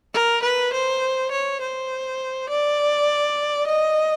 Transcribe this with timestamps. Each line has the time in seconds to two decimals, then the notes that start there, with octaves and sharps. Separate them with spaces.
0.14 A#4
0.43 B4
0.73 C5
1.31 C#5
1.61 C5
2.50 D5
3.67 D#5